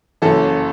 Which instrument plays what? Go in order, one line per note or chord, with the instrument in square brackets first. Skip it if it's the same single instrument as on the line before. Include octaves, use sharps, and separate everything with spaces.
[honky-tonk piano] F#1 F#2 E3 A4